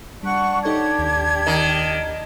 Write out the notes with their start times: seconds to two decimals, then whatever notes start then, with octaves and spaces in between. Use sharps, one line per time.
0.23 G3 D4 F#5 C#6
0.65 D#4 G4 A4 C#5 G#6
0.99 D#2
1.47 D#3